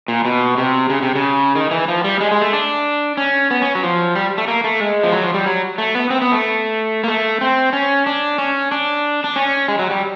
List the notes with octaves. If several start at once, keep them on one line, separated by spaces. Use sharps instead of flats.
A#2
B2
C3
C#3
C3
C#3
D#3
E3
F3
G3
G#3
G#3
A3
D4
C#4
B3
C#4
F#3
F3
G3
A3
A#3
A3
G#3
F3
F#3
F3
G3
F#3
A3
B3
C4
B3
A3
A#3
A3
C4
C#4
D4
C#4
D4
D4
C#4
G#3
F#3
G3